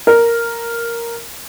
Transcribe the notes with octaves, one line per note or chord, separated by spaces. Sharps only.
A#4